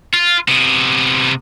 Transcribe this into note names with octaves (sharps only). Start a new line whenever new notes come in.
F4
C3 B3